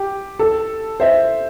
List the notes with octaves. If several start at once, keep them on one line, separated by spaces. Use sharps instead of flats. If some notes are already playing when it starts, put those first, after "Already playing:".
Already playing: G4
A4
C5 E5